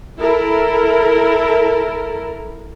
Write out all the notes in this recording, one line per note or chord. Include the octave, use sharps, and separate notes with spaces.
E4 A4 A#4